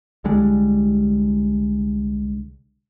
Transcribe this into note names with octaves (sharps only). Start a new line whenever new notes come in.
C2 D3 G3 G#3